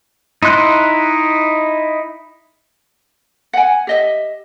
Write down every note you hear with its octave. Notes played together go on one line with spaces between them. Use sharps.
D#4 E4 C6 F#6
F#5 G#5
G4 D#5 E5